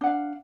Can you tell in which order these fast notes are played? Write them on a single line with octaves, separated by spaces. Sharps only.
D4 F#5 F5